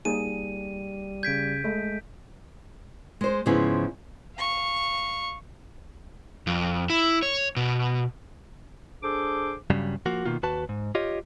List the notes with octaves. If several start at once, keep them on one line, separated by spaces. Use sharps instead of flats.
G3 A#3 D#4 G#4 D#7
C#3 G6 G#6 B6 D7
G#3 A3
G#3 C5
G#2 C#3 F3 B3 E4 G#4
F5 C#6
F2
E4
C#5
B2
D4 G#4 A4 C5 D6
G2 C#3 F#3 G3
F3 A#3 F#4
B2 D#3 A#3 F4
D#2 F#4 B4 A5
G#2
F4 G4 C#5 D#5